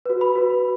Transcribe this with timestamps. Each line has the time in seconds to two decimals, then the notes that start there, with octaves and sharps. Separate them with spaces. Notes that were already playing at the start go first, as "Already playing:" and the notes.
0.06 F#4 B4
0.21 B5
0.35 F#4 B4